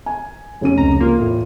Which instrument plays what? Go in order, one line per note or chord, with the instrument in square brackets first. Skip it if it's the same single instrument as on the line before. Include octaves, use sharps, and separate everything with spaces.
[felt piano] G#5
F1 C#4 D#7
[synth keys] C#2 A#5
[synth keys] A#3 [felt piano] F4
[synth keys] E2 A2